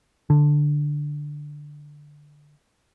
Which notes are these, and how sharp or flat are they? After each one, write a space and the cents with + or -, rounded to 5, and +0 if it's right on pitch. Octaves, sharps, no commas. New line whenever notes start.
D3 +5